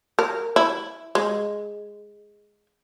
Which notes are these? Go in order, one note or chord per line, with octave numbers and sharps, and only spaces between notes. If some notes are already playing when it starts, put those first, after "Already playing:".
A#4
E4
G#3